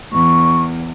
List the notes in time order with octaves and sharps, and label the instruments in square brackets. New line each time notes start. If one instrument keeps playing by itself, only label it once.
[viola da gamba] E2 [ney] C#6